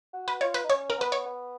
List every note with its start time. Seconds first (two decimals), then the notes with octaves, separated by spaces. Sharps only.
0.13 F#4
0.28 B4
0.41 F4 C#5
0.54 B4
0.64 D#4
0.69 C#4 C#5
0.90 A#4
0.98 B3 B4
1.12 C#5
1.26 B3